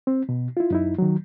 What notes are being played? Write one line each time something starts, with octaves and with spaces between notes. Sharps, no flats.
C4
B2
E4 F4
F#2 D#4 E4
D#3 F#3